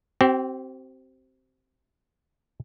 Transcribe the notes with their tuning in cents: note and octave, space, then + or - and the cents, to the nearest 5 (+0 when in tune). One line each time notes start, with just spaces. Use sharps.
C4 +0 G4 -40